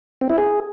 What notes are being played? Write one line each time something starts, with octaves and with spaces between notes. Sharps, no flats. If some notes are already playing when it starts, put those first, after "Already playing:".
C4
E4
G#4